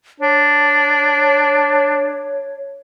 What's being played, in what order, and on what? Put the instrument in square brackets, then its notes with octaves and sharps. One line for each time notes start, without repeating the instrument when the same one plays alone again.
[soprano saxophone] D4 [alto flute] C#5